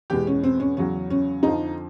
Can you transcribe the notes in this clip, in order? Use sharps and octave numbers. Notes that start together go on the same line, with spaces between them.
E2 B2 G#3 G4
C#4
C4
C#4
E2 C#3 F#3 C#4
C#4
F2 D3 F3 D#4